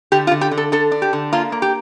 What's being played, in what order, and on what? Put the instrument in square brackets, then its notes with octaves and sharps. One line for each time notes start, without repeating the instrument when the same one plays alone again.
[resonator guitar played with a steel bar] D3 G4
F4
D3
G4
D3
A4
D3 A4
D4
G4
D3
A#3 F4
A#3
G4